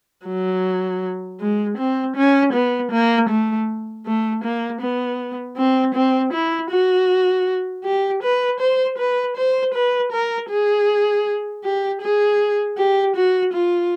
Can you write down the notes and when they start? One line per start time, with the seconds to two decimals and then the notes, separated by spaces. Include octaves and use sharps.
0.26 F#3
1.40 G#3
1.77 C4
2.16 C#4
2.53 B3
2.92 A#3
3.29 A3
4.06 A3
4.44 A#3
4.81 B3
5.57 C4
5.95 C4
6.33 E4
6.71 F#4
7.84 G4
8.23 B4
8.60 C5
8.98 B4
9.37 C5
9.74 B4
10.12 A#4
10.50 G#4
11.64 G4
12.02 G#4
12.77 G4
13.16 F#4
13.53 F4